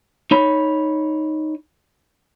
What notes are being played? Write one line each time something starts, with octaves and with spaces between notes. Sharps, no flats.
D#4 C#5 B5